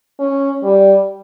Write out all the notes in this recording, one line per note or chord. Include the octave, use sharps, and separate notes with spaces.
C#4
G3